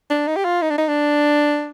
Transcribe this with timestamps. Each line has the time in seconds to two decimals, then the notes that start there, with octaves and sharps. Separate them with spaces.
0.10 D4
0.27 D#4
0.36 G4
0.44 F4
0.62 D#4
0.70 D4
0.78 D#4
0.88 D4